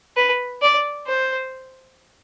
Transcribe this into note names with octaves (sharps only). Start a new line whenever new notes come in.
B4
D5
C5